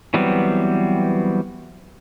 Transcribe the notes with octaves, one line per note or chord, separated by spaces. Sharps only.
E3 F#3 G3 B3 C4